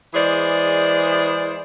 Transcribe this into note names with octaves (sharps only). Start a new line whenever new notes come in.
E3 G#3 G#4 C5 D5